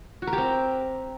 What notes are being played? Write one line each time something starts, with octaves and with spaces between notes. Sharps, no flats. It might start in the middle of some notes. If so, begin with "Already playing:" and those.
F#4
A#4
G4
C4